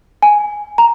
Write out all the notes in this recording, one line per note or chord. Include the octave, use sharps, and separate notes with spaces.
G#5
A#5